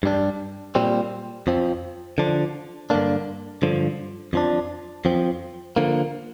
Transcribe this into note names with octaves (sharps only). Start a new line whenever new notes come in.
G2 G3 D4
A#2 G3 C4
F2 F3 C4
D3 F3 D4
G2 D3 A#3 D4
G2 D3 F3
F2 F3 D4
F2 F3 C4
D3 F3 A#3